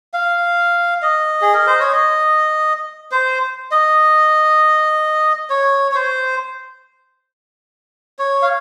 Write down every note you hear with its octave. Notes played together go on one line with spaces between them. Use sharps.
F5
D#5
G#4
A#4
C5
C#5
D#5
C5
D#5
C#5
C#5
C5
C#5
F5